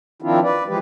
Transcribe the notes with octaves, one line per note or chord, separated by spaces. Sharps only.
D#3 F3 C4 D4 E4 F4
B4 D5
E3 F3 G#3 G4 B4